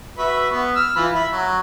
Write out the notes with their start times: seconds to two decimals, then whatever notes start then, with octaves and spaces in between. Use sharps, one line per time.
0.18 F#4 B4 E5
0.51 B3
0.75 E6 F6
0.96 E3 F4 B5
1.14 E5 B5
1.32 F#3